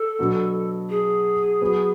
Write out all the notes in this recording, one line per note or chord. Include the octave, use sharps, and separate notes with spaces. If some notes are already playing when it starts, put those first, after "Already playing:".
Already playing: A4
B2 F#3 B3 D4 F#4
G#4
F#3 B3 F#4 B4